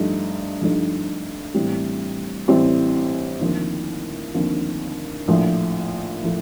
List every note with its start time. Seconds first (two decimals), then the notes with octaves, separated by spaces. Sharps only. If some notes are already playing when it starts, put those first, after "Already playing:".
Already playing: G2 F3 A3 D#4 G4
0.61 G2 F3 A3 D#4 G4
1.54 A1 A2 G3 C4 G4
2.48 A1 A2 G3 C4 G4
3.41 D#2 D3 F3 C4
4.35 D#2 D3 F3 C4
5.28 A#1 A2 F3 A3
6.22 A2 F3 A3